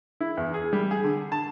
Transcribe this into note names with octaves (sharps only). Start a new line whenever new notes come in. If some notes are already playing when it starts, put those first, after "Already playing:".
E4
E2
G#4
G3
G#4
D3
A5